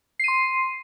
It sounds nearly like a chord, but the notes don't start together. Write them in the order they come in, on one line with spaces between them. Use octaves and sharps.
C7 D#7 C6